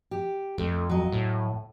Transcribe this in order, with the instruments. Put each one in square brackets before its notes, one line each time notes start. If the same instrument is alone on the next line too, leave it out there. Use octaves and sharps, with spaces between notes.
[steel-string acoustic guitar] G4
[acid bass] F2 [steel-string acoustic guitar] A3
[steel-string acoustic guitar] F#3 D#5
[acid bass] A2